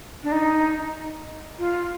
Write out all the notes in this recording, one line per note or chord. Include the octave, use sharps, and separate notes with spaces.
D4
D#4
F4